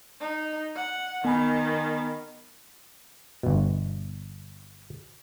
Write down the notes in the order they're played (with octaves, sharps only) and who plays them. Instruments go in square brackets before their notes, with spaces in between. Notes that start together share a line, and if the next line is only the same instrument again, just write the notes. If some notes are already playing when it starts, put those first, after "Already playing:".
[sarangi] D#4
F#5
[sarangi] D#3 [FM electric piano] B3 G#5 B5
[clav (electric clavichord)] G1 B2